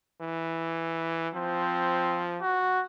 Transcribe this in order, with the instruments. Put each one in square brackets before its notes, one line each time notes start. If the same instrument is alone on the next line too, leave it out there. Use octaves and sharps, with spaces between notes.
[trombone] E3
[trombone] F3 [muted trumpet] C4
[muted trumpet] F#4